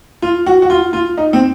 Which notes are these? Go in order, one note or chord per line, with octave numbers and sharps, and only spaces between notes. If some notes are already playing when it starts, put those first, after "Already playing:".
F4
F#4
F#4
F4
F4
D#4
C4